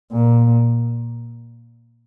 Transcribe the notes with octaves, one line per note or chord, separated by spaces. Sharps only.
A#2